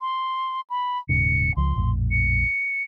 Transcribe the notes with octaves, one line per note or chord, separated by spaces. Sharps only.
C6
B5
D#1 G#2 C#3 C#7
C#2 F3 C6
A#1 F2 A2
C#7